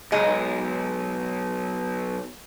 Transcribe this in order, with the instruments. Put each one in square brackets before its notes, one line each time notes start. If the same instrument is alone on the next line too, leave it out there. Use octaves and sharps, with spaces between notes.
[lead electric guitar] B1 [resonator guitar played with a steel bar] G#3